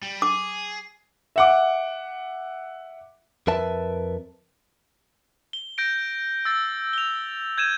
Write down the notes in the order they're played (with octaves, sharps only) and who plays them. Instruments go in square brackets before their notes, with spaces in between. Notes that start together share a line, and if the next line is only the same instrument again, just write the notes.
[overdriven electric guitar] G3
[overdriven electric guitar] G#4 [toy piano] D6
[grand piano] E5 F#5 D6
[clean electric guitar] F2 A#4 B4 E5 A5
[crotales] G7
G6 A#6 D7
E6 A6
F7 G7
G6 G#6 D#7 E7